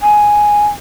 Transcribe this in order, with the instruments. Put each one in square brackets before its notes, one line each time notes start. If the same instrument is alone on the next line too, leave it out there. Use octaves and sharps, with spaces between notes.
[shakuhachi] G#5